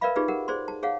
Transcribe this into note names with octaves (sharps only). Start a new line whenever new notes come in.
A#4 B4 D5 E5 F5 B5
D#4 F4 G4 G#4 B4 D5
G4 A#4 F#5
G#4 C5 D5 C6
A5
G#4 C#5 F5 F#5